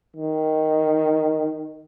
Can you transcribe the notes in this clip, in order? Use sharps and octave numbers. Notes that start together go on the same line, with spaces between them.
D#3